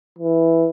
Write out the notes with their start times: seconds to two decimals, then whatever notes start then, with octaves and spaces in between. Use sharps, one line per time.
0.19 E3